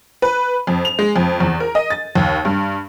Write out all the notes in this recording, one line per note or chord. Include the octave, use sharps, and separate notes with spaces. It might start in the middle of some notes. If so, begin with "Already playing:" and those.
B4
F2
F7
G#3
F2
E2
A#4
D#5
A6
D#2
G2